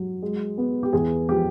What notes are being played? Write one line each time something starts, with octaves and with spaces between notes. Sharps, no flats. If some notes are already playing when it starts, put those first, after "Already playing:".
Already playing: F#3
G#3
B3
G4
E2 G#4
F3 G4